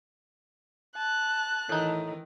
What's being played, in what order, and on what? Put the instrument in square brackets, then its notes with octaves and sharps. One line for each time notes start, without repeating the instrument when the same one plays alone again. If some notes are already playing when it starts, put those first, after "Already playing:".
[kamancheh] A5 [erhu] F#6
[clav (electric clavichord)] A2 D#4 [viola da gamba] D#3 E3